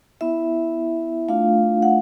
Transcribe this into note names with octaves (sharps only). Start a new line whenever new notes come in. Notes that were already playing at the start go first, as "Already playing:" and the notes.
B3 E4 E5
A3 D4 F4 F5
F#5